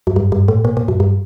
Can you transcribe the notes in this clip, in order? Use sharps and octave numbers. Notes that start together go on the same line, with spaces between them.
F#2
G2
G2
A2
A#2
A#2
F#2
G2